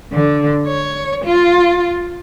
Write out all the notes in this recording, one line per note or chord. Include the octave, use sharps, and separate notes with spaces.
D3
C#5
F4